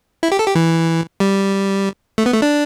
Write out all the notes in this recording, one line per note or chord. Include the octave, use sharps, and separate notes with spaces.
E4
G4
A4
G4
E3
G3
A3
B3
A3
D4